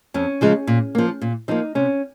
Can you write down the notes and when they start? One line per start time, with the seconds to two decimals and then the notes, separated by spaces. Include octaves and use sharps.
0.14 F2 C#4
0.41 C#3 F3 G#3
0.67 A#2
0.95 F3 A#3
1.22 A#2
1.48 F3 A#3 C4 D#4
1.75 C3 C#4